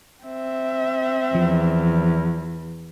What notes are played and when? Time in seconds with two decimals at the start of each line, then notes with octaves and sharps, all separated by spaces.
0.24 C4 E5
1.35 E2 F3